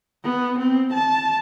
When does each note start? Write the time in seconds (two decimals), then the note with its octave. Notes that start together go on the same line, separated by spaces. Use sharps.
0.24 B3
0.58 C4
0.93 A5